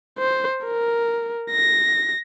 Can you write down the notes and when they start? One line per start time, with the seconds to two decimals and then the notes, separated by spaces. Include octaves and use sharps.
0.19 C5
0.65 A#4
1.51 A#6